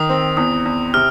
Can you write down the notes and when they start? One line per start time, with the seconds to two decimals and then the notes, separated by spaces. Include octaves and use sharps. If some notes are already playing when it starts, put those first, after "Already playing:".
Already playing: D#3 D#6
0.09 C4
0.37 E2 D#6
0.65 E2
0.94 C3 F6